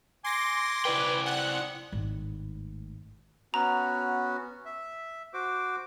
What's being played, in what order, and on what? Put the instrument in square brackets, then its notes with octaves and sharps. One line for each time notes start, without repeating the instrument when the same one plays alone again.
[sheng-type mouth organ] G#5 D6 [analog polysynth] C6 A#6
[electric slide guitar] E4 D5 G5 [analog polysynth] B4
[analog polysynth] F#5
[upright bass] G#1 A2
[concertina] B3 C#4 F#4 [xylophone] A#5
[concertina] E5
F#4 C5 D6